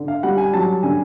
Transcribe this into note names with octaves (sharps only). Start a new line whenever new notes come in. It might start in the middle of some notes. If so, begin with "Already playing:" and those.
Already playing: D3
F5
G3 F#5
G#5
F#3 A5
D3 G#5